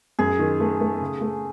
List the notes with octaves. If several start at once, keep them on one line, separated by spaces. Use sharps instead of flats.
F#2 G#4
D#3
A3
A3
C#3
A3